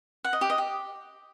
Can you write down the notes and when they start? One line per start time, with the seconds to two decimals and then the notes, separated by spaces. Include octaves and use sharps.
0.24 F#5
0.33 D#5
0.41 G4
0.50 D#5
0.58 G4